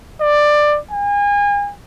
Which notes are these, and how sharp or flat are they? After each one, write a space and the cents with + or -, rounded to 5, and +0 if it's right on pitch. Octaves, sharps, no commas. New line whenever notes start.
D5 +15
G#5 -35